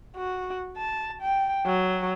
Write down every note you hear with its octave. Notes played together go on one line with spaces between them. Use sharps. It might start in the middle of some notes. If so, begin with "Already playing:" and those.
F#4
A5
G5
F#3